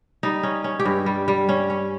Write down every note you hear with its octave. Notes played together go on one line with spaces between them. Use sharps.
G3 D#4
C#4
C#4
G4
G2
G3
G3
C#4
C#4